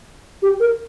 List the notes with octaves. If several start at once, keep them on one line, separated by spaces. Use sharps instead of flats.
G4
A#4